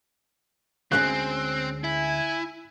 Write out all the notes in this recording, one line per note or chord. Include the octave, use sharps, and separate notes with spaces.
D2 G#3 C4 C#4 F#6
E4 G#5